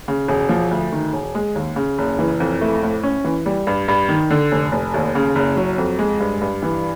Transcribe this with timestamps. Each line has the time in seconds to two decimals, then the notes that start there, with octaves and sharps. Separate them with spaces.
0.08 C#3
0.28 E1
0.49 F3
0.71 D2
0.92 D#3
1.13 E1
1.35 G#3
1.55 D#2
1.76 C#3
1.98 F#1
2.19 E3
2.40 F2
2.61 A3
2.83 A2
3.03 C#4
3.24 E3
3.46 G3
3.67 G2
3.88 G2
4.09 D#3
4.30 D3
4.52 F1
4.72 F1
4.94 D#2
5.15 C#3
5.35 F#1
5.57 F#3
5.78 F2
5.99 G#3
6.20 G2
6.41 G2
6.62 E3